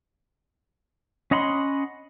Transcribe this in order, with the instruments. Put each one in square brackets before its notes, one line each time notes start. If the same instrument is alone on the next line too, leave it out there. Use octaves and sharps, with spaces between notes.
[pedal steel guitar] C#4 D#5 F#5 B5 C6